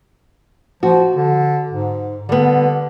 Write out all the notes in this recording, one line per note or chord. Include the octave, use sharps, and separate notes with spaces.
F3 F#4
D3
G#2
D3 G3 B3